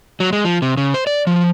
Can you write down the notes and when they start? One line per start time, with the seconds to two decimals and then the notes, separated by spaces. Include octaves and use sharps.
0.20 F#3
0.33 G#3
0.45 F3
0.62 C3
0.77 C#3
0.94 C5
1.07 D5
1.27 F3